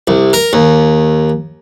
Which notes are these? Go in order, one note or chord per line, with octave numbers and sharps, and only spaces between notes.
C2
A#4
D#2